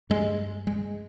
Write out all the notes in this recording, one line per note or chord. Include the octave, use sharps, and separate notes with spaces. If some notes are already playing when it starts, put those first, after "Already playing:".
G2 G#3
G#3